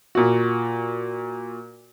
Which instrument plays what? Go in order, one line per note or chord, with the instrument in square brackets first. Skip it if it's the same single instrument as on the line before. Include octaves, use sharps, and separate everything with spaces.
[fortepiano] A#2 F#4